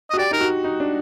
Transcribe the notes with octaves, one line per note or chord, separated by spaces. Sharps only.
D#5
F#4
G4 D5
D#4 A#4
F#4
D#4
D4